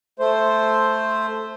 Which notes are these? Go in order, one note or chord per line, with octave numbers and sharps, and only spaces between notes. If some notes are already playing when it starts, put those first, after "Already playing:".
A3 C5